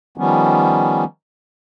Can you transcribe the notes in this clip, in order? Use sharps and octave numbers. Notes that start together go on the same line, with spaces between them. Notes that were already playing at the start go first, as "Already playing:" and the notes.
D#3 F3 G3 B3 C#4